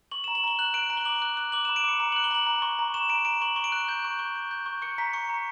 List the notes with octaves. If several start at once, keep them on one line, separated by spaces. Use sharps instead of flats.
C#6 F#7
E7
A#5
F#7
A#5 G7
F#6 F#7
F#6 D7
A#5
G7
D6 F#7
F#6
F#6
D6 F#7
E7
B5
D7
D6 C#7
A#5
F#7
F#6
G7
A#5 F#7
A#5
C#6
A#5
C#6 E7
A#5 D7
A#5 D7
C#6 F#7
C#6
D7
F#6
G6
C#6
C#6
G6
G6
C#6
C#6 C#7
A#5 B6
C#6 C#7
A#5